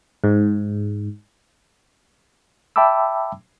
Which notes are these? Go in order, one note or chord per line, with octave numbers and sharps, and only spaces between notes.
G#2
E5 G5 A5 B5 D6 E6